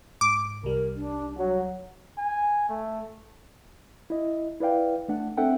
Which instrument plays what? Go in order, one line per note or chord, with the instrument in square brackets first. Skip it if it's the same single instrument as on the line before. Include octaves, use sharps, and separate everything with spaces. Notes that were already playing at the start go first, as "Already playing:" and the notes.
[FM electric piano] G#2 [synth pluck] D6
[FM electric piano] C2 G3 [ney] A#4
[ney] D4
[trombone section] F#3 [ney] F#5
[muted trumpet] G#5
A3
[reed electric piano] E4 D#5
E4 B4 D5 F5 G5
A3 D4 F#5
C4 D4 A4 E5 F#5 G5